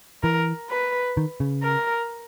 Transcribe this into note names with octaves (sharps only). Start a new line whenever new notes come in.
E3 A#4
B4
D#3
C#3
A#4